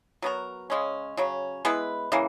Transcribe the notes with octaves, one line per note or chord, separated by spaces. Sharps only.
F#3 B3 F#4 A#4
C#3 G#3 C#4
C#3 F#3 C#4
G#3 B3 E4 B4
C#3 E3 A#3